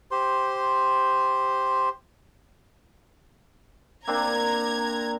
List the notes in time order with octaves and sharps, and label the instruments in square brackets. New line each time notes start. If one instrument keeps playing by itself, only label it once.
[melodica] G4 C5 C6
[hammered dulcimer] A#3 C4 D4 [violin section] A#5 G#6